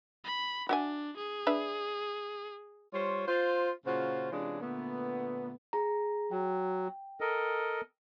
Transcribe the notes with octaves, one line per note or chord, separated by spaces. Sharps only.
B5
D4 F#4 E5 G#5
G#4
D4 B4 E5
G3 F4 C5 C#5
F4 C5
A#2 C#3 F4 F#4 C5
C3 E3 G#3 C#4 D4 F4
A#2 D3 A3 B3
G#4 A#5
F#3 G5
A4 A#4 D#5